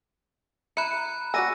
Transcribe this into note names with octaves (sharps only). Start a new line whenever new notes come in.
E4 A#5 B5 F#6 C#7
F#4 D5 G#5 E6 A#6 D#7